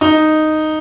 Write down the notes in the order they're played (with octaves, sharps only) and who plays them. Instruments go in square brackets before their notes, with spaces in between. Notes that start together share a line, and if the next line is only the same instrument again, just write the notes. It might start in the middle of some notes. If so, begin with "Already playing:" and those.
[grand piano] D#4